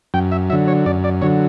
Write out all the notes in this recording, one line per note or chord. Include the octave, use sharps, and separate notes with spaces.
F#2 G5
E5
D3 F#3 E5
C#5
F#2 D5
D5
D3 F#3 C#5